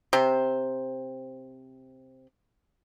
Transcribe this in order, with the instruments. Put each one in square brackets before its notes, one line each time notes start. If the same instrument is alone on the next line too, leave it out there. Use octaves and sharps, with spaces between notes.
[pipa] C3 C5